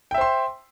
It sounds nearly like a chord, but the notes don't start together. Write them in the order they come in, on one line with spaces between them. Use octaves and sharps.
G5 E5 C5 C6